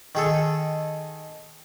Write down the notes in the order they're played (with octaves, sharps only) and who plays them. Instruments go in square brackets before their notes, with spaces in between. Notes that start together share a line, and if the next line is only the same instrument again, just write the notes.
[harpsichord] D#3 G#4 A4